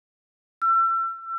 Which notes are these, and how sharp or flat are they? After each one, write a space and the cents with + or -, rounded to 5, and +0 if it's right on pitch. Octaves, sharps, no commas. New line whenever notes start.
E6 +35